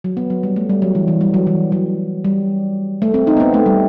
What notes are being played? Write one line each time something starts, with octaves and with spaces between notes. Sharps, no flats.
F#3
B3
F#3
G3
A3
G3
F#3
E3
E3
G3
F#3
E3
F#3
G3
A3
C4
D#4
B3
C4
A3
G3